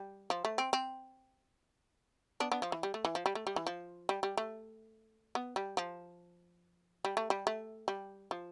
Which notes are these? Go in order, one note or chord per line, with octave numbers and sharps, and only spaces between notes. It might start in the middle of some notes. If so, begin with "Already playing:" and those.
Already playing: G3
F3
A3
C4
C4
B3 D4
B3 D4
F3
E3
G3
A3
E3
F3
G3
A3
G3
E3
F3
G3
G3
A3
B3
G3
F3
G3
A3
G3
A3
G3
F3